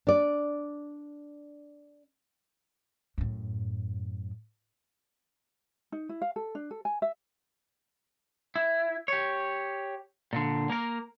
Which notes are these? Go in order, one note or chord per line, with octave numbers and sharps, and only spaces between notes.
D4 D5
F#2 A2
D#4
E4
F5
A4
D4
A4
G#5
E5
E4
G4 C#5
A#2 D3
A#3 A#4